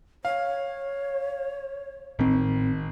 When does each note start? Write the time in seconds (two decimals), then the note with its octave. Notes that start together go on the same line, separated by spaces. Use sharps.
0.25 C#5 F5
2.19 G#1 A2 C4